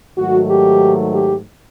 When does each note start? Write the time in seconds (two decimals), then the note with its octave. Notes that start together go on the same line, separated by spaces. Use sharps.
0.17 G#2 D#3 F#3 A3 F#4
0.48 G4
1.12 G4